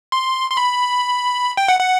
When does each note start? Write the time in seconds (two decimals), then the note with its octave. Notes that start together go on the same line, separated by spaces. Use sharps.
0.12 C6
0.50 C6
0.57 B5
1.57 G5
1.68 F#5
1.79 F#5